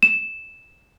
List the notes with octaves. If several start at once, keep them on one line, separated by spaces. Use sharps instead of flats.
E7